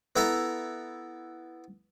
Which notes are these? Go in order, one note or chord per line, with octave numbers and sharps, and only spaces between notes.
B3 E4 A4 E5 A#5